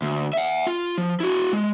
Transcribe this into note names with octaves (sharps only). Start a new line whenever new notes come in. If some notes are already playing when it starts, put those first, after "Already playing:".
D2
E5 F#5
F4
F3
E4 F#4
G#3